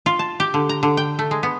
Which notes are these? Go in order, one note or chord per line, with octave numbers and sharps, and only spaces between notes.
F4
A5
G4
D3
A#5
D3
G5
A3
G#3
B3